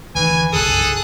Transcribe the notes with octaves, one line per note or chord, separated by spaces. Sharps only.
D2 D#3 E3 G#5
F#1 C2 G2 G#4 A4 D#6 F#6